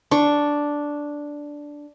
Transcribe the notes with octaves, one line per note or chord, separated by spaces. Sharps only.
D4 C#6